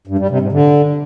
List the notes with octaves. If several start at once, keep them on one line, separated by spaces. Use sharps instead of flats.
G2
G3
C3
G#2
D3